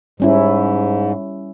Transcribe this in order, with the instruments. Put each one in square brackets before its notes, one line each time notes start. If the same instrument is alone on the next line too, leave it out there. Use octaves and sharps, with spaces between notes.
[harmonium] G#2 [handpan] G3 C#4 E4